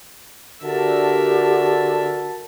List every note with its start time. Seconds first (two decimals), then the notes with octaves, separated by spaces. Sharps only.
0.64 D3 D4 F#4 G4 A#4 E5 A5